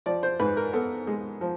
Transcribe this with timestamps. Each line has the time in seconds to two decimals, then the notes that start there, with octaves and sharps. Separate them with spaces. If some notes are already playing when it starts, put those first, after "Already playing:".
0.06 F3 D5
0.23 C5
0.40 G#2 B4
0.57 A#4
0.73 B3 A4
1.07 G#3
1.41 F3